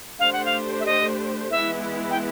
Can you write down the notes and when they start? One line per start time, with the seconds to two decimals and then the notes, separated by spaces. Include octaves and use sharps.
0.19 A3 D4 G4 C5 F5
0.33 F#5
0.45 F5
0.80 E5
0.86 D#5
1.51 E3 G#3 B3 E4 E5
2.11 G5